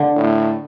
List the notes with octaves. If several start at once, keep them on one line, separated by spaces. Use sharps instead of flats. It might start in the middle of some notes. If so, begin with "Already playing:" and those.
Already playing: D3
A2